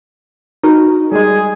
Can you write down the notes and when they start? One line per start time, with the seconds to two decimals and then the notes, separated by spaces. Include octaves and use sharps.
0.64 D#4 F#4 A#4
1.12 G3 G#3 G#4